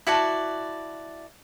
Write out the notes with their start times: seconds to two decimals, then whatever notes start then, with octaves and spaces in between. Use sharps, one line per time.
0.07 E4 F#4 D5 A5